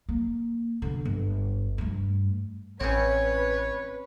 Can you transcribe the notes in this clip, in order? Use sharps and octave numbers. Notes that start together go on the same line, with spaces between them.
A#3
D3 B3
G1
G2 A3
A1 C4 C#4 B4 C#5